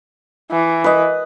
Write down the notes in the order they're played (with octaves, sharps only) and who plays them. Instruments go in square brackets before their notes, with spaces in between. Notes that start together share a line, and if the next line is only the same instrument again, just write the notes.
[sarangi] E3
[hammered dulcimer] B4 D#5